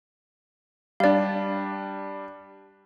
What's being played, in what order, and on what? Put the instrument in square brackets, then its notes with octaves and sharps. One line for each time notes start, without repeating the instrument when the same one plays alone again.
[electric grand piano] G3 D4 [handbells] D5 F5